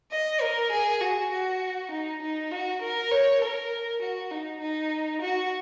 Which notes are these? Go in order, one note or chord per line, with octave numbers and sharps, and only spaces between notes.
D#5
A#4
G#4
F#4
F#4
D#4
D#4
F#4
A#4
C#5
A#4
F#4
D#4
D#4
F#4